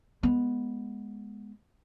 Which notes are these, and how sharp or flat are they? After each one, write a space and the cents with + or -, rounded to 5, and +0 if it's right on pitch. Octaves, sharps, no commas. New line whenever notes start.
G#3 +0 B3 -10